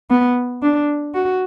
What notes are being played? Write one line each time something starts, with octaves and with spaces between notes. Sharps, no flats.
B3
D4
F#4